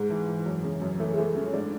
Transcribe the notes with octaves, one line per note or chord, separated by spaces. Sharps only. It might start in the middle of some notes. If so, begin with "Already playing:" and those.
Already playing: G#2 G#3
E3
E3
F#2
C#3
F#2
E3 A3
G#3
E3 A3
E3 C#4
G#2 D4